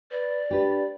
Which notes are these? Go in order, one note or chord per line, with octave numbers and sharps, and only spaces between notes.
B4 D5
D4 G4 B4